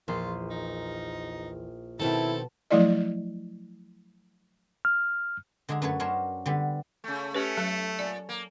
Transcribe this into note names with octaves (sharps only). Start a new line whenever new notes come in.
A#1 E2 F4 C6
D#4
B2 D#3 C4 E4 A4 A5
F3 F#3 A3 E4 D5 D#5
F6
D3 G#3 D4 G#4 A#5
F#2 A3 B4 C#5
F#3 C#4 D4 A#4 C5 C#5
D3 G3 B3
C#3 A3
A3 C#4 G4 B4
F#3 A4
A#2 D5
A#3